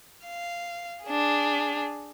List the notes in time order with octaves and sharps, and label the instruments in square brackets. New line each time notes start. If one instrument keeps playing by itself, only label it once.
[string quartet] F5
D4 G#4